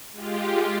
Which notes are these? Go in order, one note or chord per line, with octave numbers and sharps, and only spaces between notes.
G#3 F4 G4